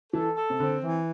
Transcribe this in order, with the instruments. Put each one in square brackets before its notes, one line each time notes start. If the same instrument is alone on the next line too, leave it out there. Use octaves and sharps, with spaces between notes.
[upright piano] E3 [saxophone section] A4
[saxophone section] A4
[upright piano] C3
[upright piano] D3 [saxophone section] C4
[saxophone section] E3